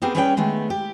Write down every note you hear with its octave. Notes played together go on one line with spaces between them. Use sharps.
B3 C4 G4 G#4 A#4
G3 C#4 G#4 B4 C#5 G5
D#3 G#3 A3 B3
G4